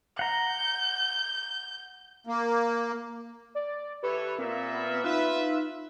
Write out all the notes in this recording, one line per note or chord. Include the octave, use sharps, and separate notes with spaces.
F#5 A#5 G6
A#3
D5
E3 G4 A4 B4 C#5
A#2 A#3 C4 E5
B3
D#4 F4 B4 E5